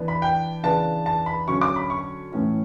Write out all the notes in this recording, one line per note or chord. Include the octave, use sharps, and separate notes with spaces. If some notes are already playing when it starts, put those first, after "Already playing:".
Already playing: E3 B3 D4
B5
G5
C#3 E3 B3 D4 A5
A5
B5
D3 F#3 C#4 C#6
D6
B5
C#6
A2 E3 A3 C#4